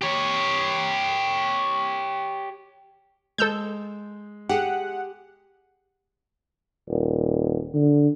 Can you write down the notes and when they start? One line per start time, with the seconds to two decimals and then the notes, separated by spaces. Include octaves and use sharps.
0.02 G4 C#5
3.38 G#3 A4 E6 G6
4.49 G4 G#4 F#5
6.88 D#1
7.74 D3